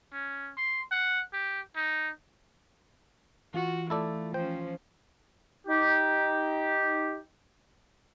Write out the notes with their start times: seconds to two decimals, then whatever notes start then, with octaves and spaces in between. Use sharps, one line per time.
0.13 C#4
0.57 C6
0.91 F#5
1.33 G4
1.76 D#4
3.54 E3 F4 F#4
3.90 A3 E4 A4 D5
4.34 F3 C#4 C5 G5
5.67 D#4 G4